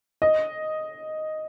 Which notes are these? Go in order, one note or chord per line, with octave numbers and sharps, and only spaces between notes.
D#5